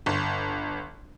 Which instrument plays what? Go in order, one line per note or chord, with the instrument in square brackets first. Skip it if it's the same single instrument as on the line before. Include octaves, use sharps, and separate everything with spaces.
[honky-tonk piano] G1